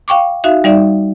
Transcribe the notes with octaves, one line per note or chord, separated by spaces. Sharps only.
F5 G5 C#6 D6
D#4 F#4 E5 F5
G3 D#4 D5 E5